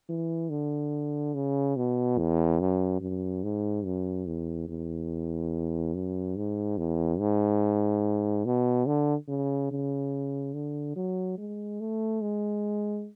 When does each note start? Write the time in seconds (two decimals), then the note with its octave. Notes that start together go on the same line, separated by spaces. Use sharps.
0.09 E3
0.50 D3
1.34 C#3
1.76 B2
2.18 E2
2.60 F#2
3.01 F#2
3.43 G#2
3.85 F#2
4.27 E2
4.68 E2
5.94 F#2
6.37 G#2
6.78 E2
7.19 G#2
8.46 B2
8.86 D3
9.28 C#3
9.71 C#3
10.54 D3
10.96 F#3
11.38 G#3
11.80 A3
12.21 G#3